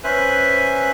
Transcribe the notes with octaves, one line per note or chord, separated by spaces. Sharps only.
C#4 B4 C5 E5 G#5 F#6